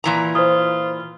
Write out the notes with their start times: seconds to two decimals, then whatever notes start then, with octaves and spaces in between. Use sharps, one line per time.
0.04 A#2 E3 A#5
0.35 F4 C5 D#6